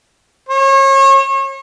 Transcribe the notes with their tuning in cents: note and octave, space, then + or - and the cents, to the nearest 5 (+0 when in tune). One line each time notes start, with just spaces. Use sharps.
C#5 -35